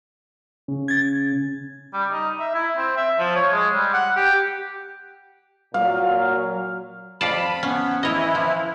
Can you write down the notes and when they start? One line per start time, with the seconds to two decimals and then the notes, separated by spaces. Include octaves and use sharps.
0.68 C#3
0.88 G#6 A6
1.94 G3
2.12 D#4
2.40 E5
2.54 E4
2.77 C4
2.97 E5
3.19 F3
3.36 C#5
3.52 G#3
3.74 G3
3.93 F#5
4.16 G4
5.74 A#2 F#3 F5
7.21 F2 F4 D5 A5 B5
7.63 B3 C#4
8.03 E3 E4 C#5 D#5
8.35 F3